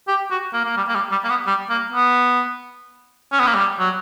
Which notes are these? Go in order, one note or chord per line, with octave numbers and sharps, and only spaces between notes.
G4
F#4
A#3
A#3
G3
A#3
G3
G3
A#3
B3
G3
A#3
B3
C#4
B3
A#3
G3
F#3